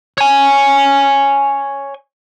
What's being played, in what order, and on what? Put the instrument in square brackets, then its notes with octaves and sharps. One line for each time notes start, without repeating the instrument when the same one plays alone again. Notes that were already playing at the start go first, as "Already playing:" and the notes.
[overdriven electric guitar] C#5 G#5